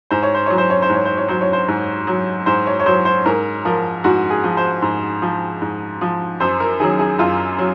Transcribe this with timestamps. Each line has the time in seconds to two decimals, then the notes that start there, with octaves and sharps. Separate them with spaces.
0.11 G#2 C5
0.23 C#5
0.35 C5
0.46 F#3 C#5
0.58 C5
0.70 C#5
0.82 C5
0.89 G#2 C#5
1.05 C5
1.17 C#5
1.28 F#3 C5
1.41 C#5
1.53 C5
1.68 G#2
2.07 F#3
2.46 G#2 C5
2.66 C#5
2.79 C#5
2.86 F#3 C5
3.05 C5
3.26 G#2 A#4
3.65 F3 A#4
4.04 G#2 F#4
4.30 G#4
4.44 F3
4.57 C5
4.82 G#2
5.22 F3
5.62 G#2
6.01 F3
6.40 F#2 C5
6.60 A#4
6.80 D#3 F#3 G#4
6.99 G#4
7.19 F#2 F4
7.59 F#3